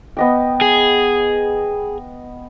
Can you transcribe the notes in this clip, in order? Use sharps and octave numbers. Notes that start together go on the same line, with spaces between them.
B3 D#5 G5
G#4